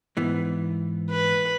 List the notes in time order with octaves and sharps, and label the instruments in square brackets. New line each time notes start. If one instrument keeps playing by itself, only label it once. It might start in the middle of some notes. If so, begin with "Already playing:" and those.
[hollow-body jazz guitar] G#2 E3 B3
[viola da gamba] B4